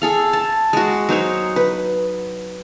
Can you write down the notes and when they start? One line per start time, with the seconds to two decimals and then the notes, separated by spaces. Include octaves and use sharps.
0.02 G#4 A4 F5
0.33 A5
0.73 G#3 F#4
1.09 F#3 D#4 C5 C#5
1.56 B4